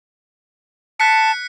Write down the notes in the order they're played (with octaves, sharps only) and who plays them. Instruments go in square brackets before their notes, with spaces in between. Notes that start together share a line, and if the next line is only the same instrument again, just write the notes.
[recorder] A5 [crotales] F#6 B6 C#7